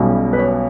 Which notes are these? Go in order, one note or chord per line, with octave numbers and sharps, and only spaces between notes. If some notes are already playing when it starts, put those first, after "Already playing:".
Already playing: B1 B2 G3 C#4
B4
C#5